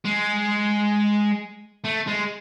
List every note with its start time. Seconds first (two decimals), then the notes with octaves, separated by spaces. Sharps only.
0.05 G#3
1.84 A3
2.07 G#3